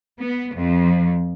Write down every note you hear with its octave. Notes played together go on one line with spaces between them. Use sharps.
B3
F2